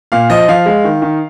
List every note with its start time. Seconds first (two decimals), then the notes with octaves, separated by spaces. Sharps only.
0.12 A#2 F5
0.29 F3 D#5
0.48 F3 F5
0.66 G#3
0.84 D#3
1.02 D#3